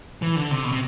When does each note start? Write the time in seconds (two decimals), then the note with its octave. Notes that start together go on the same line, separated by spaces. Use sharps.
0.22 E3
0.36 D3
0.51 C3
0.64 B2
0.72 C3